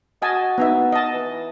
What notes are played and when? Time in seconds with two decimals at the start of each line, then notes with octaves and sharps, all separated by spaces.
0.22 F#4 D#5 G#5 A5
0.58 B3 D#4 E5
0.92 D#5 A5
1.14 E3